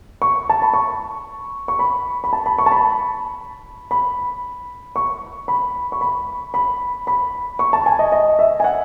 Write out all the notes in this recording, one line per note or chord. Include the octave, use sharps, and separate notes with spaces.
C#6
A5
B5
C#6
C#6
B5
B5
A5
B5
C#6
A5
B5
B5
C#6
B5
C#6
B5
B5
B5
C#6
A5
G#5
D#5
D#5
E5
G#5
F#5